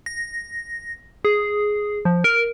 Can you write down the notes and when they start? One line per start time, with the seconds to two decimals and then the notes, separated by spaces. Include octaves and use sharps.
0.06 A#6
1.25 G#4
2.05 F3
2.24 A#4